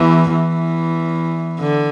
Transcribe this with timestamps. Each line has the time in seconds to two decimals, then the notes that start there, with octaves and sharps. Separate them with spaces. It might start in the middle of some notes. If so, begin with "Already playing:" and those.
Already playing: E2 E3
0.34 E2 E3
1.59 D3